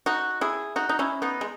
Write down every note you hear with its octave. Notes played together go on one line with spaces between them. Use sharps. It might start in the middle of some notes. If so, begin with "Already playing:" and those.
D#4 F#4
E4 G#4
D#4 F#4
D#4
C#4 E4
B3 D#4
G#3